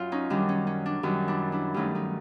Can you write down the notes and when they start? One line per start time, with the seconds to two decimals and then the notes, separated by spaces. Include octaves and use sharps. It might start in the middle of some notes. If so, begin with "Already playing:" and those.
Already playing: F#2 F4
0.12 C#4 D#4
0.30 F#2 D#3 G3 D4
0.49 C#4
0.67 C#4
0.86 D4
1.03 F#2 D#3 G3
1.28 D4 E4
1.52 D4 E4
1.74 G2 D#3 F#3 A3 C#4 D#4
1.95 C#4 D#4